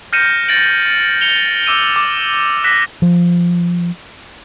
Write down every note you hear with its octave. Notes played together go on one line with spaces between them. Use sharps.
F6 G6 A#6 C#7 D#7 E7
A6 A#6 C#7 D7 F#7
C#7 F7 G7
D6 E6 D#7
D6
D6 F#6 A#6 B6 E7
F3